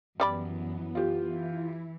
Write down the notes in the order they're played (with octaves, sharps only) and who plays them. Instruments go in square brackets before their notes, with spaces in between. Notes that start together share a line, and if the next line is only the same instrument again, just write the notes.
[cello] F#2 [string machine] E3 B3 [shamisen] G3 D5 B5
[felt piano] F4 G4
[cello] E3 [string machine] E4